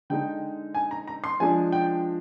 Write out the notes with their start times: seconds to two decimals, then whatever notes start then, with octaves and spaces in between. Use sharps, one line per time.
0.10 D3 G#3 D#4 G5
0.74 G#5
0.91 A#5
1.08 A#5
1.24 C6
1.40 F3 G#3 D4 G#5
1.72 G5